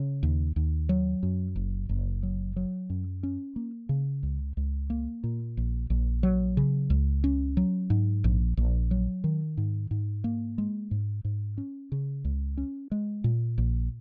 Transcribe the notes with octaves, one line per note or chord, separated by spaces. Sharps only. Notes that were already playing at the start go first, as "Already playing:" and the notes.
Already playing: C#3
D#2
D#2
F#3
F#2
F#1
F#1
F#3
F#3
F#2
C#4
A#3
C#3
C#2
C#2
A#3
A#2
A#1
A#1
F#3
C#3
C#2
C#4
F#3
G#2
A#1
A#1
F#3
D#3
G#2
G#2
A#3
G#3
G#2
G#2
C#4
C#3
C#2
C#4
G#3
A#2
A#1